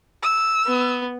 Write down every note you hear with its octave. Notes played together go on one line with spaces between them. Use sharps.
E6
B3